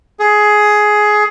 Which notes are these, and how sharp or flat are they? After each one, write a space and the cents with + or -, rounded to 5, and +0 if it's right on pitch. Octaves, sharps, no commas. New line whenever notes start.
G#4 +15